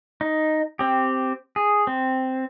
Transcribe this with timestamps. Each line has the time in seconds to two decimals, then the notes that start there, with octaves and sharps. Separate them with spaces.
0.21 D#4
0.79 C4 G4
1.56 G#4
1.87 C4